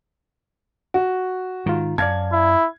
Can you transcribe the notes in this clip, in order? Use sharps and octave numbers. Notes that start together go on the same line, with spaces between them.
F#4
G#2 D#3 F4
F#2 D5 F5 A5 G#6
E4